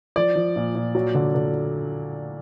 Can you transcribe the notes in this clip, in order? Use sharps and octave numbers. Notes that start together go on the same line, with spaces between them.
F3 D5
F3
A#2
A#2
F#3
D3
D3